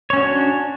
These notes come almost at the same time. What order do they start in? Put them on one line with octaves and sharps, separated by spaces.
C#5 C#4 F#4 D4